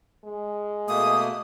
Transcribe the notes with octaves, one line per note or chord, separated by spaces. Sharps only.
G#3
B2 A3 A#3 D#6